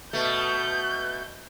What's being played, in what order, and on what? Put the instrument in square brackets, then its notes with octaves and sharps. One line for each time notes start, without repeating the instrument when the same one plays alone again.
[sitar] B2 A3 [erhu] G6